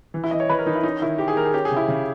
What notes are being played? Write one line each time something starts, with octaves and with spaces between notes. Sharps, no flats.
E3
E4
E3 D#5
C#5
E3 B4
A#4
E3 D#4
E4
C#4 D#4
D#3 E4
D#3 G4
G#4
D#3 A#4
G#4
C#4 G4
G#4
C#3 E4
C#3